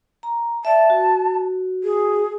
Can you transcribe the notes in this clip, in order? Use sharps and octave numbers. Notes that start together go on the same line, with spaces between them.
A#5
D5 E5 A5
F#4
G#4